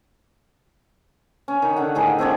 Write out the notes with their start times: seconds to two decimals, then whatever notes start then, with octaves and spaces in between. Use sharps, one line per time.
1.48 C#4
1.62 D#3
1.76 D3 F#5
1.95 A2 D#3 G#4 G#5
2.18 C4 D4 C#5 D5